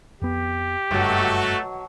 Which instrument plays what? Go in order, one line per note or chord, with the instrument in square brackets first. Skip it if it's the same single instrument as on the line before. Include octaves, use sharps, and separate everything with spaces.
[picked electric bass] F2 B3 [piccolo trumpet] G4
[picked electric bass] F#1 G2 [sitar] B2 F#3 [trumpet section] A3 F#4